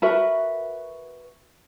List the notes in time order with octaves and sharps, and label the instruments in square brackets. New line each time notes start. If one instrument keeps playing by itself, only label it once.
[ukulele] F#4 A#4 B4 E5